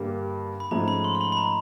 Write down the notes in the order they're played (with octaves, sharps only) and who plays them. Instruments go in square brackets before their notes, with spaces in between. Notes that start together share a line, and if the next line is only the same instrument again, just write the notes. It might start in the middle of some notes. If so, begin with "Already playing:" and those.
Already playing: [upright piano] G2 D3 G3 A#3
[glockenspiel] B5
[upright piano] G#2 F3 A3 C#4 [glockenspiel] A#5
[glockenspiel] B5
C6
C6
B5
B5
A#5